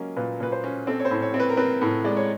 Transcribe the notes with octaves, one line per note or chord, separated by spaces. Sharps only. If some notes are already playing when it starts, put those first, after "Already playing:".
Already playing: F#3 A#3 C#4 D#5
A#2 B4
A#2 B4
C5
C#4
C4 A4
C#5
C5
A2
C#5
C4
B4
A#4
C4 B4
A2
G#3 D5
C#5